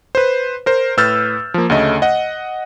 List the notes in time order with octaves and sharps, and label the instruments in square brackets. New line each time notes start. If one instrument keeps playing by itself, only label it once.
[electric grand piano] B4 C5
A#4 C5
A2 B4 E6 F6 G6 A6
F3 A#3
D2 C#3 A3 D#5
D#5 F#5